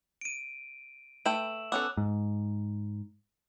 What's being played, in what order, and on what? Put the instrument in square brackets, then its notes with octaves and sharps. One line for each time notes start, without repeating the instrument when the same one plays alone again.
[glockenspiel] D7 D#7
[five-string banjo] A3 B4 G5 [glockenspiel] E6 E7 F#7
[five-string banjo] B3 C#4 A4 [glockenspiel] D6 E6 F#6
[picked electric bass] G#2